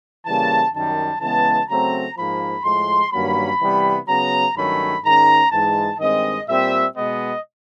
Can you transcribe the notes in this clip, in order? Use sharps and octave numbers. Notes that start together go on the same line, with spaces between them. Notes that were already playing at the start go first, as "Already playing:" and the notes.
C#3 E3 G3 A#3 A5
F#2 D#3 G3 A5
C#3 E3 G#3 B3 A5
C#3 F#3 A3 C4 A#5
G#2 F3 A#3 B5
A2 F3 G#3 C6
G2 D#3 F#3 A#3 C#4 B5
C3 E3 G3 B3
C#3 F#3 B3 A#5
G2 D#3 F#3 A3 C#4 B5
G#2 D#3 G#3 C#4 A#5
G#2 E3 G#3 A5
G2 D#3 G#3 C4 D#5
A#2 G3 C4 E5
B2 G#3 B3 D#5